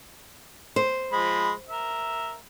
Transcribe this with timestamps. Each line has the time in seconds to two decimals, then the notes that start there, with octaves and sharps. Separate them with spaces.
0.76 C5
1.13 F3 G#3 B5
1.69 A#4 E5